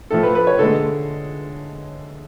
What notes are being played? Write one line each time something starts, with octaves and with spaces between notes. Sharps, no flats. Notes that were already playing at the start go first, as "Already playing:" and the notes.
A2 F3 A3 A4
B4
B4
C#5
D3 G#3 A4